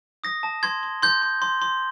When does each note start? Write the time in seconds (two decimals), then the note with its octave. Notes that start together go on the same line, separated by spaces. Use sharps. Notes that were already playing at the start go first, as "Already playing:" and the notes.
0.24 D#6 A#6
0.43 A5
0.63 C6 G#6
0.83 C6
1.02 C6 G6
1.22 C6
1.42 C6
1.62 C6